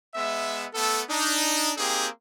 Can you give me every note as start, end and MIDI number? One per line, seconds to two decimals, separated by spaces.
0.15 0.66 56
0.15 0.66 59
0.15 0.66 76
0.74 1.03 57
0.74 1.03 59
0.74 1.03 69
1.10 1.72 62
1.10 1.72 63
1.78 2.08 58
1.78 2.08 60
1.78 2.08 63
1.78 2.08 67
1.78 2.08 68